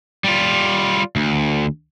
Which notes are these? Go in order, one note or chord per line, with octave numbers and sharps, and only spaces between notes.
G3 F4
D2